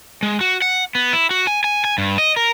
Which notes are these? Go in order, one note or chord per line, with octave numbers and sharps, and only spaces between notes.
G#3
F#4
F#5
B3
E4
F#4
G#5
G#5
G#5
G2
D#5
A#4